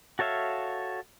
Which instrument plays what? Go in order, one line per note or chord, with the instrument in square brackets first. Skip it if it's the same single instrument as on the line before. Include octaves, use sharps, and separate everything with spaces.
[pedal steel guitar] F#4 A4 C#5 E5 F5